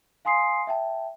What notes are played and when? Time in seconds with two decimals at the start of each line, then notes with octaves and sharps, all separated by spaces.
0.25 F5 G#5 C6 D#6 C7
0.67 E5 G5 A5